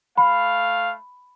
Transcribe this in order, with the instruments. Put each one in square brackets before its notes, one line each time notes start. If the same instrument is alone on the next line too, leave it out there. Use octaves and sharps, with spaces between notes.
[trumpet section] A3 F5 [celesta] B5